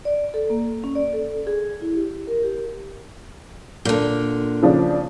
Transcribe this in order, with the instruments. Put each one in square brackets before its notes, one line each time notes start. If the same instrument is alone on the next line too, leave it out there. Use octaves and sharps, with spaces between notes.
[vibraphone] D5
A4
A#3
C#4
D5
A4
G#4
E4
G4
A#4
G4
[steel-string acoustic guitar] A#2 D3
[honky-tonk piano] C#3 F3 D4